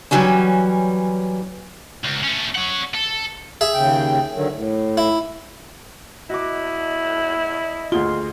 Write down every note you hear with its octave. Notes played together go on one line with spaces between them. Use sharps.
E3 F#3 G3 C#4
C#2
A3 C#4
C#4 F#5
A4
G#4 E5
D#2 C#3 G5
D3 D#3 F#3
A2
E4
E4 F#4 D#5 D6
D2 F4 G#4 G7